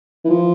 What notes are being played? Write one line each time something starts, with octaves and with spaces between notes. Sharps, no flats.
E3
F3